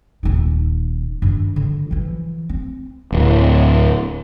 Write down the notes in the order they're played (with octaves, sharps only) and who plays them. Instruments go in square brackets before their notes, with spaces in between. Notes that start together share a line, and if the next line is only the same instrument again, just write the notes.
[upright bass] D#1 D#4
G2 D#3
D3
E3 F3
C4
[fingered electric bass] D1